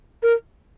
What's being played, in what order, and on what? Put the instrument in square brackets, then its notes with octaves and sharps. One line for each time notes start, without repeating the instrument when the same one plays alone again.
[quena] A#4